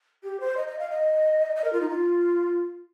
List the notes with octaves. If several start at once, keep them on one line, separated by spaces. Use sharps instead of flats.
G4
C5
D#5
D#5
F5
D#5
D#5
A#4
F4
D#4
F4